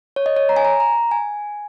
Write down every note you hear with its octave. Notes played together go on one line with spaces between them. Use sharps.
C#5
D#5
C#5
A#5
G#5
A#5
A#5
G#5